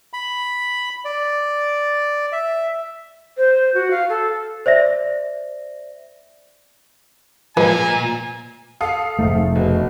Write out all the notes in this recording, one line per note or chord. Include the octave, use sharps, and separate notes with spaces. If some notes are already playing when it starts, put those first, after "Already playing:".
B5
D5
E5
C5
F#4
F5
A4
C5 D5 E5 A#6
A#2 F3 G#3 B4 G#5
A4 F5 D#6
F1 G#2 A3
F#1 B2